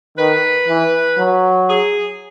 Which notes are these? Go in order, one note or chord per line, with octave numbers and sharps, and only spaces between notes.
D#3 B4
E3
F#3
G#4